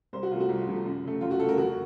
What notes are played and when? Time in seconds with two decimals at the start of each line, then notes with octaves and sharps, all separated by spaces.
0.13 C2 C5
0.23 F#4
0.31 C3 F3 A3 F4
0.40 F#4
0.49 C2
0.67 C3 F3 A3
0.85 F#2
1.04 C#3 A3
1.21 F#2 F4
1.31 F#4
1.39 A3 A4
1.44 C#3 A#4
1.57 F2 F#4